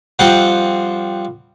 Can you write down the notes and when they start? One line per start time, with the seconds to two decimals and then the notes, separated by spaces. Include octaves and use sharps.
0.19 F2 G3 C4 F4 F#5